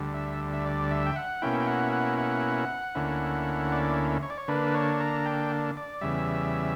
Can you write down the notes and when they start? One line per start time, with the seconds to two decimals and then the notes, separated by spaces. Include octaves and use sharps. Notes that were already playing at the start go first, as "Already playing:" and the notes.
Already playing: D2 D3 G3
0.14 E5
0.53 E5
0.65 D5
0.91 E5
1.06 G5
1.16 F#5
1.42 B2 A#3 C#4 E4 G5
1.60 G5
1.67 F#5
1.93 F#5
2.18 F#5
2.95 D2 D3 A#3 C#4 E4
3.72 D5
4.23 C#5
4.30 D5
4.38 C#5
4.48 D3 A#3 D4 B4
4.74 C#5
5.00 A#5
5.25 G5
5.77 D5
6.01 E2 C#3 G3 E5